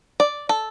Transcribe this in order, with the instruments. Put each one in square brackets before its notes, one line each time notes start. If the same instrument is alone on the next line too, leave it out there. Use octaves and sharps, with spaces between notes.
[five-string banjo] D5
A4